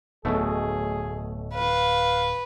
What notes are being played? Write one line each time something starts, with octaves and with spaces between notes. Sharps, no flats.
D1 B1 B2 A3 G#4
B4 F5